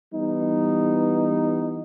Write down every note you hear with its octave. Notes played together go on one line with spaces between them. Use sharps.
E3 G3 B3 D#4